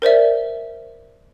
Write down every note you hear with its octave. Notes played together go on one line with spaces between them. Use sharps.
A#4 C5 D5 E5